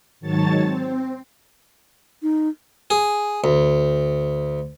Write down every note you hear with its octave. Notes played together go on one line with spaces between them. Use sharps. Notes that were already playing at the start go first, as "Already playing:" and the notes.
G#2 D#3 F#3 C#5 A5 A6
C4
D#4
G#4
D2